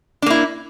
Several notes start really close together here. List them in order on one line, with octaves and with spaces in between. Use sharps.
D4 A#3 E4